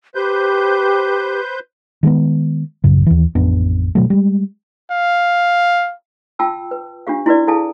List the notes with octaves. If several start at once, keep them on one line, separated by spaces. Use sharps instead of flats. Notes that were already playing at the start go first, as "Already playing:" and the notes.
G4 B4 C5 G6
D#3 G#3 A#3 B3
A1 F#2 C#3
D#2 E3
A1 F2 B3 D4
B2 F#3 A3
G3 G#3
F5
F4 G5 A5 E6
B4
D4 F4 G4 F5
E4 F#4 B4 D5
E4 G#4 A4 F5 G#5 A5